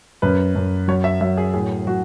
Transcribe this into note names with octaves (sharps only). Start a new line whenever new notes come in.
F#2 B4
F#2
F#3 C#5
E5
F#3 E5
G#4
A2 G#4
F#3 F#4